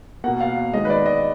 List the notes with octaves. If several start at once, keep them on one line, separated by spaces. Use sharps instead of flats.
B2 A#3 F#5
F5
D#3 G#3 D#5
B4
D5
D#5